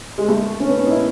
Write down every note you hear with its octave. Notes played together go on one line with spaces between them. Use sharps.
G#3
A3
C#4
B3
C#4
D#4
E4